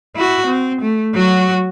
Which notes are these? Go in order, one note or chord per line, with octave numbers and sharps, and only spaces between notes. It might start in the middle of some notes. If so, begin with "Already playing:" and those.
E4 F#4
C4
A3
F#3 F#4